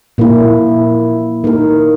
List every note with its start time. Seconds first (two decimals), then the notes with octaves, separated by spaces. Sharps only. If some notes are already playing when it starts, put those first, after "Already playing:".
0.18 A#2 A#3 E4
1.44 A#3 D#4 A#4